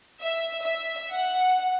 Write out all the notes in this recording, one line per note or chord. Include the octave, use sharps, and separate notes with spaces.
E5
E5
F#5